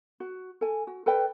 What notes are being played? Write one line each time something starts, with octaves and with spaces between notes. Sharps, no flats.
F#4
A4 G#5
F#4
A4 B4 D5 G5